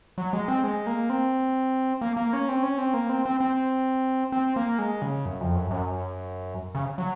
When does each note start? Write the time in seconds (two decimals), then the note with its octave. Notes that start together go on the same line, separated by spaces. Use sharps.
0.18 F#3
0.33 G#3
0.48 C4
0.64 G#3
0.87 A#3
1.10 C4
2.01 A#3
2.17 A#3
2.33 C#4
2.49 C4
2.63 C#4
2.78 C4
2.94 A#3
3.10 C4
3.26 C4
3.40 C4
4.32 C4
4.56 A#3
4.79 G#3
5.02 C#3
5.26 F#2
5.41 F2
5.55 F#2
5.71 F#2
6.75 C#3
6.98 F#3